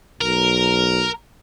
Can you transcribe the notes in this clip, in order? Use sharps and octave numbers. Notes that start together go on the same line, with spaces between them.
B1 A#4